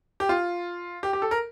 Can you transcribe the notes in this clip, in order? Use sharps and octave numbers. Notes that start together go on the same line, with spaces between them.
G4
F4
G4
G4
A4
A#4